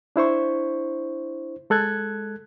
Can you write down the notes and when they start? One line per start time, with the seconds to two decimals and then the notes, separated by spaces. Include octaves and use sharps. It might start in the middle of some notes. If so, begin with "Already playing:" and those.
0.16 D4 E4 C5 C#6
1.70 G#3 A4 F#6 G#6